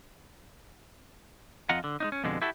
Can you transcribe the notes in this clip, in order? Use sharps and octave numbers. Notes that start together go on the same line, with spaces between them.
F2 F4 D#5 F#5 A#5
D3
G#3 D4 D#4
C#4
F2 B2 D3 G#3
E4 F#4 G4 A4